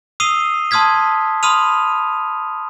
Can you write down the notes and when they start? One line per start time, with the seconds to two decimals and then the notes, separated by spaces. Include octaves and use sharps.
0.20 D#6 E6 C7 D#7 F7 G7
0.71 A5 C6 D#6 F6 G#6 B6
1.43 B5 C6 D#6 F6 D#7 F7